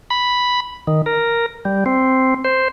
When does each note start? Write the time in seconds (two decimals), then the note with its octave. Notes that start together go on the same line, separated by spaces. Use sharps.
0.10 B5
0.87 D#3
1.06 A#4
1.65 G3
1.86 C4
2.44 C5